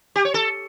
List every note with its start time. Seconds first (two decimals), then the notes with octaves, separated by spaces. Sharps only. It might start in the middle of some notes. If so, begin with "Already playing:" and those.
0.16 G4
0.25 C#5
0.34 A4